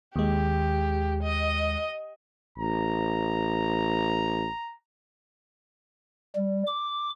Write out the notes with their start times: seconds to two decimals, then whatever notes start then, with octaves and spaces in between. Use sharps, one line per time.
0.16 D#2 G#3 G4
1.23 D#5
2.58 A1 A#5
6.36 G3
6.67 D6